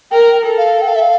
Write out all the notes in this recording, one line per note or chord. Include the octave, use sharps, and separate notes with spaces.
A#4 G5
A4
F5
G5
F5
E5
F5